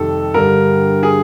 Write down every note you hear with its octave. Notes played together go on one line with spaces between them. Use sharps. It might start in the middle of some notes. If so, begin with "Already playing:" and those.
Already playing: F2 C3 D#3 G3 A4
G2 D3 G3 A#4
G#4